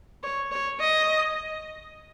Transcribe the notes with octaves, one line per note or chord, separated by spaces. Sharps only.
C#5
C#5
D#5